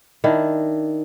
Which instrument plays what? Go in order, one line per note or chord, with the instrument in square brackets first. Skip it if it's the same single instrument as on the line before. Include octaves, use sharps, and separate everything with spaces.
[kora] D#3 D4 E4